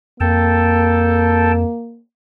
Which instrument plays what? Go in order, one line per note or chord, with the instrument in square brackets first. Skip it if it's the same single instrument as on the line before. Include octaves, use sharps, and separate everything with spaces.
[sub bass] F2 [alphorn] A#3 [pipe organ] A4 G5 A5